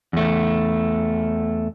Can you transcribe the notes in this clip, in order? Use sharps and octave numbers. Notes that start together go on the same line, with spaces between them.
E2 A3